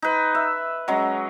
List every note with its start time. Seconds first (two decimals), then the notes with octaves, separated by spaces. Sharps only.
0.02 D#4 B4
0.35 E5
0.88 F#3 G#3 C#4